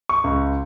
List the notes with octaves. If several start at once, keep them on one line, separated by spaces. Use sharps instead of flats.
C#6
C#2